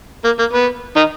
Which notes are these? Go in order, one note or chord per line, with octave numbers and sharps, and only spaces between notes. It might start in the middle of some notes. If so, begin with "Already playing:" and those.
A#3
A#3
B3
D#3 D#4